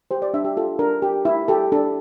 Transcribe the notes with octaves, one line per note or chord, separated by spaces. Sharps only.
G4 C5
D5
D4 E5
G4
F4 A4
D4 A#4
G4
E4
G4 A4
D4 A4